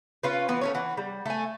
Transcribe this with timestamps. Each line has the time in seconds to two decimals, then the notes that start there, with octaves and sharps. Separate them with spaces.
0.23 C#4 F4 B4
0.48 E3 B3
0.61 A3 C#4 C#5
0.74 E3 F#5
0.97 G3
1.26 A3 G#5